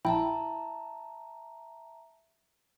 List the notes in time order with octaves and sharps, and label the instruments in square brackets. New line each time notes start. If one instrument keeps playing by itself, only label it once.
[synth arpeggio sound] A#1 E4 G5 [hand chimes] E5 A5 A#5